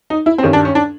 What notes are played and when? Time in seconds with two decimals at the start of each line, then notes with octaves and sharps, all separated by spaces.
0.10 D#4
0.26 E4
0.38 C4
0.43 G2 D#3 C#4
0.53 D4
0.65 C#4
0.75 D4